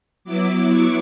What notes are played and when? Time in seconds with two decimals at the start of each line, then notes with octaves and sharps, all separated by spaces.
0.24 F#3 B3 E4 D6
0.68 C#6